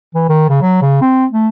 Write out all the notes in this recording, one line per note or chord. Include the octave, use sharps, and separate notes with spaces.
E3
D#3
C#3
F#3
C#3
C4
A3